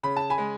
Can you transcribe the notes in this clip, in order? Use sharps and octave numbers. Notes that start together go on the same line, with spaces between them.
C#3 B5
A5
G#5 B5
G#3